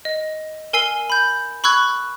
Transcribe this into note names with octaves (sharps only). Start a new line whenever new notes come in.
D#5
A#4 G#5 E6 C7 G7
B5 G6
B5 C#6 E6 F#6 G#6